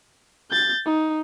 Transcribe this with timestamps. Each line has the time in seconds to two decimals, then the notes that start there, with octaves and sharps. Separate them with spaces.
0.51 G6 A6
0.86 D#4